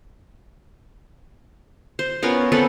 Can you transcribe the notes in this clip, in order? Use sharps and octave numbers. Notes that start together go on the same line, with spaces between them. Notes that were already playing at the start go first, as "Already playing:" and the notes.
C5
B3 C#4 F4 A#4
B3 C4 A4 B4